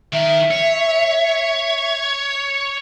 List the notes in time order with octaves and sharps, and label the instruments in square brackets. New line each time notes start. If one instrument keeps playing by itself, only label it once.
[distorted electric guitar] D#3 A#4 [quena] E5
[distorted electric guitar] C#5